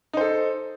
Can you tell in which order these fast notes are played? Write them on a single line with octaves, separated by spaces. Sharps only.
D#4 C5 A4